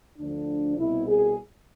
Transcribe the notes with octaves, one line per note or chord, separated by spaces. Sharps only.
D2 D3 F3 D4
C2 B2 E4
G#4